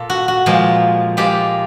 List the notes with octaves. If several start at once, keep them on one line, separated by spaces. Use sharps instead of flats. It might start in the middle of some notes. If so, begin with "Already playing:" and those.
Already playing: A#2 A4
F#4
F#4
A#2 F3 G#3
A#2 F3 G#3 G4